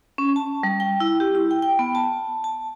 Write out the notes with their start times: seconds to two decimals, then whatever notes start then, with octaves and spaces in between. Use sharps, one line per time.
0.18 C#4
0.36 A5
0.63 G3
0.80 G5
1.00 E4
1.20 G4
1.35 E4
1.51 G5
1.62 G5
1.79 B3
1.95 A5
2.44 A5